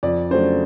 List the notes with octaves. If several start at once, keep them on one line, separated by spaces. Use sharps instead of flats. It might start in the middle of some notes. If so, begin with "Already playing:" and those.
F2 D5
C#3 F#3 A3 D4 C5